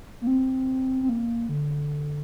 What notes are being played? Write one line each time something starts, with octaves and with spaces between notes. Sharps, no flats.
A#3
C4
C4
A#3
D3